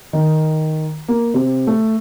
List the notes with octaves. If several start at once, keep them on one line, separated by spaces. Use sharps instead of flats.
D#3
A#3
C3
A3